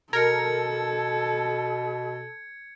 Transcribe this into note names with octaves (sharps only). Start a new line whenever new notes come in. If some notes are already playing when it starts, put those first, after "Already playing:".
B2 A4 A#4 G#6 C#7